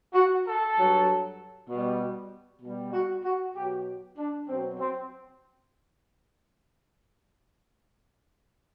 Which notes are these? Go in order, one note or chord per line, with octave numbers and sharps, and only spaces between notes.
F#4
A4
G2 F#3
B2 G3
B2 G3
F#4
F#4
B2 F#3 G4
D4
B2 F#3 C4
C4